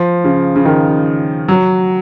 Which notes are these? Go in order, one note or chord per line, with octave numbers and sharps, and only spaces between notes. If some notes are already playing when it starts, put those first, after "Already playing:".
Already playing: F3
C#3
C#3
D#3
F#3